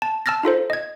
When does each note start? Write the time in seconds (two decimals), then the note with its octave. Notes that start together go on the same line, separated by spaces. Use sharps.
0.02 A5
0.26 A5 E6 F6 A6 A#6
0.43 D#4 F4 A4 C5
0.70 D#5 G#6